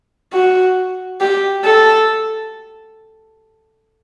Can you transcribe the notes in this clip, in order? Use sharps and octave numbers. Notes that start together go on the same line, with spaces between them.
F#4
G4
A4